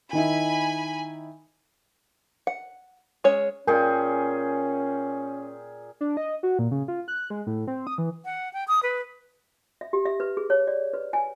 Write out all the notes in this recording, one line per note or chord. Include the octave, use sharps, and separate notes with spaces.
D#3 D#4 E4 G#5 B5
F#5
G#3 C#4 C#5
A#2 C#4 G#4 A#4 G5 G#5
D4
D#5
F#4
A#2
C#3
F4
F#6
G#3
A2
C4
D#6
E3
F#5
G5
D#6
B4
E5
G4
E5
B4
G#4
C#5
D5
B4
G#5